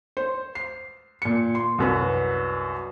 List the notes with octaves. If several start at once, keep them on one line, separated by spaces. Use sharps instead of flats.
C5
C7
A#2 C#7
C6
C2 F#2 B4